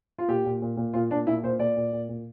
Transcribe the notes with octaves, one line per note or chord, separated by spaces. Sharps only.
F4
A#2 G4
A#2
A#2
A#2
A#2 F4
A#2 D4
A#2 E4
A#2 C5
A#2 D5
A#2
A#2
A#2